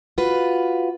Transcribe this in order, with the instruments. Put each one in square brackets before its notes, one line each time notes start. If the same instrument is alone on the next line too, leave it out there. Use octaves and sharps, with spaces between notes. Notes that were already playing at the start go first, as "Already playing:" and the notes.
[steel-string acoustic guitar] F4 F#4 B4